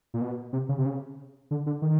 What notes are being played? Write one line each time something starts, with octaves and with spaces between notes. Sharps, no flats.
A#2
B2
C3
C#3
C3
C#3
D3
D3
D#3